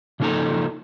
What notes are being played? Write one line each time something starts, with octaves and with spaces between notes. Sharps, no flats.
C#3 F3 A#3 D#4 A4 A#5